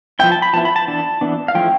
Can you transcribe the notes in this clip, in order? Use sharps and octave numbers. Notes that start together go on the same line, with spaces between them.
F3 B3 E4 G5
A5
B5
F3 B3 E4 A5
B5
A5
E3 B3 D4 A5
E3 B3 D4
F5
F3 A3 E4 G5